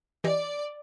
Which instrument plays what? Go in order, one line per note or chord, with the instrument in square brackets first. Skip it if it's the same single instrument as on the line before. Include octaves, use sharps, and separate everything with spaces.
[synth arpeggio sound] E3 G4 D#5 [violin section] D5